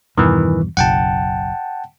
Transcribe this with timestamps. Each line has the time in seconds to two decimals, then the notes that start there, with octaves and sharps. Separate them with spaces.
0.18 E2 G2 B2 D#3 E3
0.77 F#1 B1 F#2 F#5 G5 A5